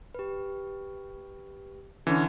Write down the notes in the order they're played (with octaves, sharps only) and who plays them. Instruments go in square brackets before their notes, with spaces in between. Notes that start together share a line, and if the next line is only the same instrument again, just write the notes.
[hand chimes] G4 B4
[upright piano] D3 [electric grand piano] E3 [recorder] C#4